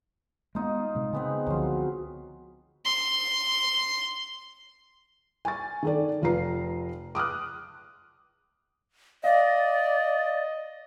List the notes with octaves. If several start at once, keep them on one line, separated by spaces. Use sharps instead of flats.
G#3 A3 B3 D#4 F4
C3 G#3
C#3 G#3 B3 C4
C#2 D3 F3 F#3 F4
C6
G#5 C#6 A6
D#3 A4 D5
F1 F4 B4 A#5 C7
D6 D#6 F6 F#6
D5 D#5 F5